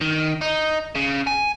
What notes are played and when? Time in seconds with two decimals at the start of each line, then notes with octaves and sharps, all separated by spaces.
0.01 D#3
0.41 D#4
0.95 C#3
1.27 G#5